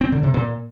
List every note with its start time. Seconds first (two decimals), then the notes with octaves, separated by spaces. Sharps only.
0.01 C4
0.12 D3
0.23 C3
0.34 A#2